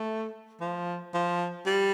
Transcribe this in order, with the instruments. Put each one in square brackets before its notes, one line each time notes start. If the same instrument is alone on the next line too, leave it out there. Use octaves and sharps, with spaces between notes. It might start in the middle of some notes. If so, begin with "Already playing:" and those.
Already playing: [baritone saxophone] A3
F3
F3
G3